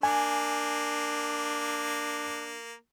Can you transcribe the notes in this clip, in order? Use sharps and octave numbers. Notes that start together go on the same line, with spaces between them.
A#3 D4 G#5